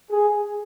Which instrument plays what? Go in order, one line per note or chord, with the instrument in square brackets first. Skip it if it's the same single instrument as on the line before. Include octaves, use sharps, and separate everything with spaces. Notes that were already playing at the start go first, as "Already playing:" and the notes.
[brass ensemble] G#4